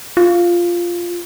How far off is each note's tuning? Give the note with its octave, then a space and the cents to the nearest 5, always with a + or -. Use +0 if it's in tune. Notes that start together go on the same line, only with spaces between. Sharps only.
F4 -5